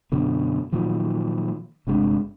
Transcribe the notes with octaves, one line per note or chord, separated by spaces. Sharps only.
F#2 B2 D3
A#2 D#3 F3 F#3
G1 C3 G#3 D4